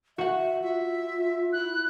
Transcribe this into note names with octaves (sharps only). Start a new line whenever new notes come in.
F#4 E5 F#5
F4 E5
E4 F#6